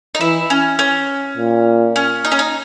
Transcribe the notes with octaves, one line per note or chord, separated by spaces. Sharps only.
D#4
E3 E4
C#4
C#4
A#2
C#4
D#4
C#4
D#4